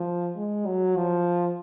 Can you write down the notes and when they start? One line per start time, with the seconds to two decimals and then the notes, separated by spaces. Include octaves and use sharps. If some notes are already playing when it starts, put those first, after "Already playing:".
Already playing: F3
0.36 G#3
0.66 F#3
0.97 F3